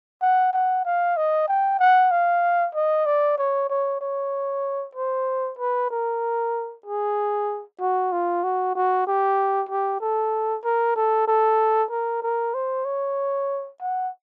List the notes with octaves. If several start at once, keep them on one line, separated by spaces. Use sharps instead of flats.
F#5
F#5
F5
D#5
G5
F#5
F5
D#5
D5
C#5
C#5
C#5
C5
B4
A#4
G#4
F#4
F4
F#4
F#4
G4
G4
A4
A#4
A4
A4
A#4
A#4
C5
C#5
F#5